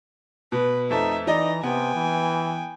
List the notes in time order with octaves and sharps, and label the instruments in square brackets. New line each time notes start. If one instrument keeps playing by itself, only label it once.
[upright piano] B2 [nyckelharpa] B4
[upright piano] F2 A3 A5 [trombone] D#4 [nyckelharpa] E5
[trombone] E3 [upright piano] D#4 D5 D#5 [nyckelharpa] A#5
[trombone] C3 [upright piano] B3 [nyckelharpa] G5 G#5
[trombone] E3